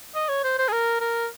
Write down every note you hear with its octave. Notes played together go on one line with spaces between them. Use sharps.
D#5
C#5
C5
C5
G#4
A#4
A#4